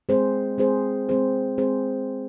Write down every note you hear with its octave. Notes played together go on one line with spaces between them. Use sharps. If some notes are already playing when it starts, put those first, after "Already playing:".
G#3 C4 G#4 C5
G#3 C4 G#4 C5
G#3 C4 G#4 C5
G#3 C4 G#4 C5